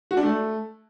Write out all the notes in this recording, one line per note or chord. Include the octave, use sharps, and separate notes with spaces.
F#4
D4
A3